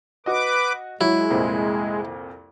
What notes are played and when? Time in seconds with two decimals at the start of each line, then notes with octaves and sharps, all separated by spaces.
0.26 F#4 B4 D#5 D6
1.01 F#3 G#3 E4
1.30 C2 F2 A#2